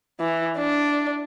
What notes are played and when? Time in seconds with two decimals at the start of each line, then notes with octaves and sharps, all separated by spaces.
0.20 E3
0.59 D4